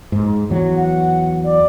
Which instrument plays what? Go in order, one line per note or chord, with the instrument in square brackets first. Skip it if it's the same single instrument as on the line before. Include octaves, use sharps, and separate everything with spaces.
[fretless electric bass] G#2
E2 F#3
[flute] F#5
D5